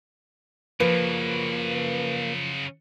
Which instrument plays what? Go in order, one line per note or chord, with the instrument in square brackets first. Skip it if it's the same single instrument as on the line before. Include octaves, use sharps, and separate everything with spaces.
[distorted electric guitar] C#3 F#3 [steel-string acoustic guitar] F3 [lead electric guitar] A#3 [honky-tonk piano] B4